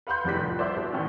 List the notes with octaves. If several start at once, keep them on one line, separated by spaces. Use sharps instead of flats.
B4 F5 F#5 B5 C6 G6
F1 A2 C3 D5 F#6 B6
C2 F3
C5 D5 E5
B2
A2 D#3 E3